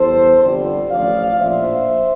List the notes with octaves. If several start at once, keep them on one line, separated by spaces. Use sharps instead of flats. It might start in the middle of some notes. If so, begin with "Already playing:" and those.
Already playing: E2 E3 G3 A4 C5
G1 F2 D3 G3
A1 A2 F3 D5 F5
A#1 A2 F3 C5 E5